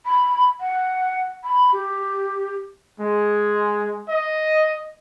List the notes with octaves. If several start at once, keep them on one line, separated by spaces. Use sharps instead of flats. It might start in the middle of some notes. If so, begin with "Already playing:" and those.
B5
F#5
B5
G4
G#3
D#5